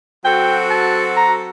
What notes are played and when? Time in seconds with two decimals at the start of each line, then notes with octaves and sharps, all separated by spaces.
0.24 F#3 C4 F#4 A4 G5
0.70 A5
1.16 A#5